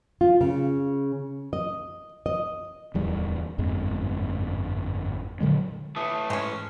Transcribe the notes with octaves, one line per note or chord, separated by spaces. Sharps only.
F4
C#3
D#5
D#5
D1 E2 G3
G1 F2 G#2 G#3
A#2 D3 F#3 G#3
E3 A3 D#6
G#2 G#3 C#4